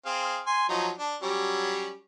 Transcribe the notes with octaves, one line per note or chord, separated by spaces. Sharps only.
C4 G#4 F5
G#5 C6
F3 F#3 D#4
D4
F#3 G3 C#4